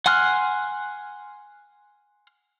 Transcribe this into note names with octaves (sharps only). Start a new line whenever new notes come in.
F#5 G#5 C6 F6 F#6